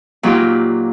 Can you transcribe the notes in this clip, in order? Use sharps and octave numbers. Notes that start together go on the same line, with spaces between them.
A#2 F#3 D#4 F4 G4